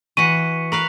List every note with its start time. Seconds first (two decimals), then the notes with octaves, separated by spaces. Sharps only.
0.17 E3 F#4 F#5 C#6 B6 C#7 D#7
0.72 A#4 B4 F5 A#5 C#6 F#7